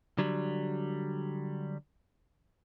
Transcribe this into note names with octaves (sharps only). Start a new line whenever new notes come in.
D3 F#3 G3